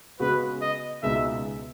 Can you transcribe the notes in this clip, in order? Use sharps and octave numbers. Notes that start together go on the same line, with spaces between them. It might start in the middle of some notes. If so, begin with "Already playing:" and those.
C#3 G#3 B3 F#4 B4
D#5
C#2 B2 G#3 D#4 E5